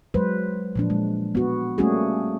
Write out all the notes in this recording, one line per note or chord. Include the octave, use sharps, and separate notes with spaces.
F#3 G#3 B4 C5
A#2 F3 D4
G#3
B3 F#4
G3 A3 A#3 C#4 F#4 G#4